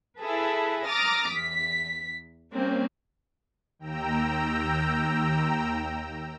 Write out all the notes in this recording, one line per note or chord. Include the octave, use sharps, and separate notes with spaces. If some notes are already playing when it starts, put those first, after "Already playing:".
E4 G#4 A4 B4
A#5 D6 D#6 F6 A6 A#6
E2 B6
G3 A#3 C4 C#4
D#2 G5 A#5 E6